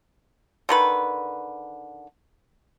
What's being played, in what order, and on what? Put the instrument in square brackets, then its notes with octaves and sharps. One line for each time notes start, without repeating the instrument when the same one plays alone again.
[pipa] D3 D#3 B4